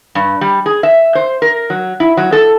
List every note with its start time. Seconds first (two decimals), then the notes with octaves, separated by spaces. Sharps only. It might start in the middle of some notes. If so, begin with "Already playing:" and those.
0.15 G2
0.41 G3
0.66 G#4
0.83 E5
1.15 C5
1.42 A#4
1.70 F#3
2.00 E4
2.17 F#3
2.32 A4